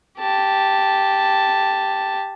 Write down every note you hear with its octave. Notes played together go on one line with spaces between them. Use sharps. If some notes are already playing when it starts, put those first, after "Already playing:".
G4 A5